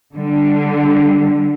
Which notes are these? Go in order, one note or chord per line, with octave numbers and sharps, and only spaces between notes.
D3 G3